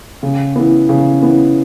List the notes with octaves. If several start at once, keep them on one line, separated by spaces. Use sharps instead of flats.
C#3
E3 B3
C#3
E3 B3